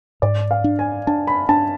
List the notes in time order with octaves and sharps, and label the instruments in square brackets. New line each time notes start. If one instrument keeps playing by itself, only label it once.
[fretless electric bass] G#2 [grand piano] D5
[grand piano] F5
[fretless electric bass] D4
[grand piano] G#5
[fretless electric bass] D4 [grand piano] A5
[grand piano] B5
[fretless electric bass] D4 [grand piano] A5